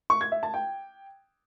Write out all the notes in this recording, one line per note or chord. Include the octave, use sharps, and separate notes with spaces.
C#6
G#6
E5
A5
G5